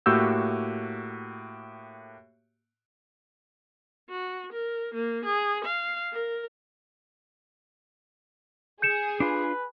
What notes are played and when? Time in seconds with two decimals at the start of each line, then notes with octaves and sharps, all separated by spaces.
0.06 A2 A#3 F#4 G4 E6 G6
4.09 F#4
4.52 A#4
4.94 A#3
5.25 G#4
5.64 F5
6.12 A#4
8.82 G#4 G6 C#7 E7
9.20 D4 F4 B4